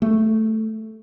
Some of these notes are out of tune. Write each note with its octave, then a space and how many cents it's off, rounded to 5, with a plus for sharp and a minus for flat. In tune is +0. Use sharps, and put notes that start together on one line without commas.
A3 +0